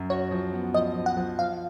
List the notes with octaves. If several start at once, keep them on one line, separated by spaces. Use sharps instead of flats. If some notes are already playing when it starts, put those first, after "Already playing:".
Already playing: F#2
F#4 C#5
F3
B3
F3 D#5
F3
F#5
F3
F3 F5